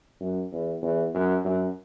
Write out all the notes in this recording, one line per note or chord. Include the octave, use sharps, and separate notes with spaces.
F#2
E2
E2
F#2
F#2